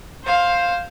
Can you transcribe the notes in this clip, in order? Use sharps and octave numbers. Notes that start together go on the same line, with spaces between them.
C5 F5